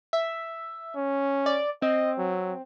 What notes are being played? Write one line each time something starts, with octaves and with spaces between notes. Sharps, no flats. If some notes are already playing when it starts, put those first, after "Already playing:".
E5
C#4
D5
C4 D#5
F#3